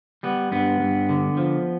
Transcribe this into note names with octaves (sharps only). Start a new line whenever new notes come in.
G3 B3
G2 B3
G2
D3
F3